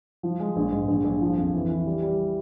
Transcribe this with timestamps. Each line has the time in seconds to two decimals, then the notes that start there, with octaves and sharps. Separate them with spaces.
0.23 F3
0.40 G#3
0.56 A#1
0.72 G#2
0.88 A#1
1.05 A#1
1.21 F3
1.37 F2
1.54 E3
1.70 E3
1.86 G3
2.02 G3